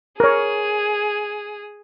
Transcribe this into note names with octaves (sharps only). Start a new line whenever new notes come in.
G#4 A#4 C#5